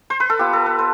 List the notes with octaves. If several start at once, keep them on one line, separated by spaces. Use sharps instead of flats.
C5
B4
A4
B3 F4 G4
A4
B4
C5